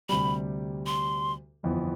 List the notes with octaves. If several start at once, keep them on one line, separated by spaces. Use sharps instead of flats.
D2 C3 G3 B5
C6
G1 F2 E3 B3